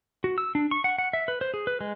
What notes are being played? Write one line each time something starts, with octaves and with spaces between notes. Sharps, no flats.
F#4
E6
D4
C#6
F#5
F#5
E5
B4
C5
G#4
B4
G#3